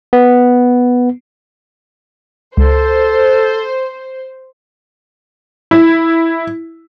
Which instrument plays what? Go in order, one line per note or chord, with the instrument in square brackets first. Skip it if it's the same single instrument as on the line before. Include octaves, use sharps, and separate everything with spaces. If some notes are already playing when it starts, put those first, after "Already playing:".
[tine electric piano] B3
[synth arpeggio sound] C#2 [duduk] A4 [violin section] C5
[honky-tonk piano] E4